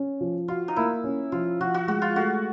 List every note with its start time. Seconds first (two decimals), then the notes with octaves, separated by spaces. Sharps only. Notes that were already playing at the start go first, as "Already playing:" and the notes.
Already playing: C#4
0.21 F3
0.48 F4 F#4
0.68 D#4
0.76 A#3 E4
1.04 C#4
1.32 F3 F4
1.60 F3 F#4
1.74 F#4
1.88 G#3 F#4
2.02 F4
2.16 A3 F#4